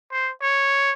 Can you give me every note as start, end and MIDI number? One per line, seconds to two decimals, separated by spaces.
0.12 0.32 72
0.42 0.93 73